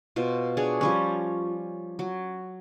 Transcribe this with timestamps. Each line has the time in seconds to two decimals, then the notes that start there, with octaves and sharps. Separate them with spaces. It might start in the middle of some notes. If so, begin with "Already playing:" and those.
0.16 B2 F4 C5
0.57 D4 G#4 C#5
0.81 F3 G3 C#4
1.99 F#3